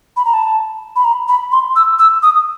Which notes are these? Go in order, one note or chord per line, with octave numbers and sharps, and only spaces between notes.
B5
A#5
A5
B5
A#5
B5
C6
E6
E6
D#6